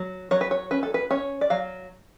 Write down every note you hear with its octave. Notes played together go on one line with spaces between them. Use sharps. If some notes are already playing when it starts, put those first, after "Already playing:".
Already playing: F#3
F#3 C#5
B4
C#5
C#4 B4
A4
B4
C#4 C#5
D5
F#3 F5